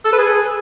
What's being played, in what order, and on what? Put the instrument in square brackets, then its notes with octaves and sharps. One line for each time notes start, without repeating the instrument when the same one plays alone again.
[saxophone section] A4
B4
G#4